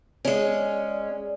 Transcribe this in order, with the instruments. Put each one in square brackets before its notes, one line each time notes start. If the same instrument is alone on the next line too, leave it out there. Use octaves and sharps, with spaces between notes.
[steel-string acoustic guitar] G#3 C#4 [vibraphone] D5